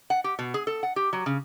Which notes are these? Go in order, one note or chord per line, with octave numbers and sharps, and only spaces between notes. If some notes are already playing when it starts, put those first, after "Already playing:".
F#5
G4
B2
G#4
A4
F#5
G4
F#3
C#3